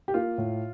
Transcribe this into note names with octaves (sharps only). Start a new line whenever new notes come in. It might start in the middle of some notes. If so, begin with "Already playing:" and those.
G4
A#3 F4
A2